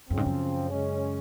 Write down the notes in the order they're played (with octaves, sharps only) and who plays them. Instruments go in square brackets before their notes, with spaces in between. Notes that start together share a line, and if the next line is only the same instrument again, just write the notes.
[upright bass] F#2 [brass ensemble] C#3 F3 C4
[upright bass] G#2
F#2
[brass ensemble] C#3 G#3 C#4